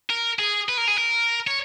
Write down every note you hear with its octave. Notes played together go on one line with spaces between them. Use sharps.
A#4
G#4
B4
A#4
G#4
A#4
C#5